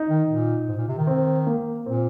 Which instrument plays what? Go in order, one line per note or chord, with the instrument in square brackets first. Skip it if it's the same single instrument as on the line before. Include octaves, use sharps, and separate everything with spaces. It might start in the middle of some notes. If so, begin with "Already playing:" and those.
Already playing: [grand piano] D#4
[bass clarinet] D#3
A#2
G#2
A#2
C3
D#3
[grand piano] C4
A#3
[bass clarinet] A#2 [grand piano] C4